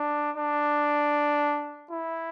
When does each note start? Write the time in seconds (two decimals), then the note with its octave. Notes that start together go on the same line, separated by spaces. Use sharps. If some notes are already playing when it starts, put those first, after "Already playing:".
Already playing: D4
0.36 D4
1.90 E4